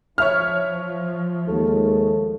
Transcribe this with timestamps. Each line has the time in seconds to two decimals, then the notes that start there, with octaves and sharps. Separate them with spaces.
0.18 F3 C#5 E5 F6
1.48 D#2 G#3 A3